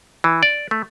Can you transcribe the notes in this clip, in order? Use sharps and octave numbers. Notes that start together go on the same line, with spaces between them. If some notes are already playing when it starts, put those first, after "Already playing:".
E3
D5
A3